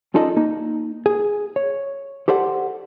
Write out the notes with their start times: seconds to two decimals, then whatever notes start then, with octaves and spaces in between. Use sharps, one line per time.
0.14 C#4 D#4 F4 A4 D5 D#5
0.36 A#3 D#4
1.06 G#4
1.56 C#5
2.28 G4 A4 C5 D5 F#5